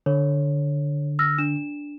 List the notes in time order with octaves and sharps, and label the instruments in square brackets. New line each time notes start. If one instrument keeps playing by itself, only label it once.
[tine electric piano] D3 [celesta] C#5
[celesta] E6 F6 A#6
D4 E7